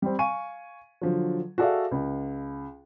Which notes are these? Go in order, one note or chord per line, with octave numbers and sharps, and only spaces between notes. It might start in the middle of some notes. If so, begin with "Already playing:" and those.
G3 C4
F5 G#5 C#6 D#7
D3 F3 F#3
F#4 G#4 A4 D5 E5 F5
C#2